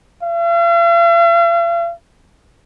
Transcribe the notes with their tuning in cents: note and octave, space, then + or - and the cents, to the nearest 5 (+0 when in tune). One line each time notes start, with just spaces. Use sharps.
F5 -45